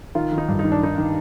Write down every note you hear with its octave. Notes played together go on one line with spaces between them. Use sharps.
D#3 F4
D#3
D#4
G2
D#4
D#3
D4
D#3 D#4
D#3